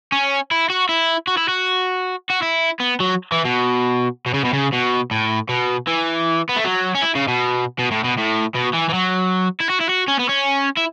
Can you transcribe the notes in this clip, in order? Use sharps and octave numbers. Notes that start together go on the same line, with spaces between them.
C#4
E4
F#4
E4
F#4
E4
F#4
F#4
E4
B3
F#3
E3
B2
B2
C#3
B2
C#3
B2
A2
B2
E3
B3
A3
F#3
C#4
E4
C#3
B2
B2
A2
B2
A2
B2
E3
E3
F#3
E4
F#4
E4
F#4
C#4
B3
C#4
E4